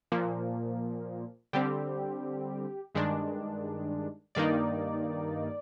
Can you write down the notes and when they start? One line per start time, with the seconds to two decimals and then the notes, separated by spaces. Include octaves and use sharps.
0.12 A#2 F3 A#3
1.53 D3 G3 C4 G4
2.95 G2 D#3 G#3 D4
4.35 G2 D#3 A#3 D#4 D5